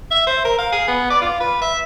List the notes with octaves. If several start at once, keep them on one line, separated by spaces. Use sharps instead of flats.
E5
C5
A#4
F5
G#4
B3
D5
F4
B4
E5